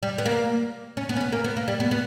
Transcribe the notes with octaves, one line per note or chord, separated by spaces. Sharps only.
G3
B3
A#3
C#4
B3
C#4
B3
A#3
B3
A#3
G3
B3
B3